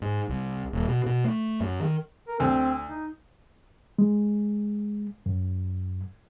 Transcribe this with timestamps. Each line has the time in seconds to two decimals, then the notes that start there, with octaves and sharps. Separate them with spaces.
0.02 G#2
0.29 C2
0.73 D#1
0.88 B2
1.06 B2
1.24 A3
1.60 F#2
1.80 D#3
2.28 A#4
2.40 D2 C4
2.89 D#4
3.99 G#3
5.26 F#2